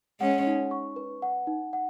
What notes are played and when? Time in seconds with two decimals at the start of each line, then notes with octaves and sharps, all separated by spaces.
0.21 G#3 C#4 F#5
0.47 D#4
0.71 C#6
0.96 B4
1.22 F#5
1.47 D#4
1.73 F#5